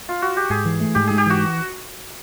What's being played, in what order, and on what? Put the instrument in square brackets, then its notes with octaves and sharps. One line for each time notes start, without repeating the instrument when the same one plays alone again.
[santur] F4
F#4
G4
[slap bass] G#2 [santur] G#4
[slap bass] E3
A3
[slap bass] G#2 [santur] G4
[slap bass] G#2 [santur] G#4
[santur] G4
[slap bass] E3 [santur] F#4